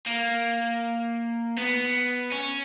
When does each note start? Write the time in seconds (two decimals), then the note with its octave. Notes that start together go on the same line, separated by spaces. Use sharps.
0.06 A#3
1.57 B3
2.32 C#4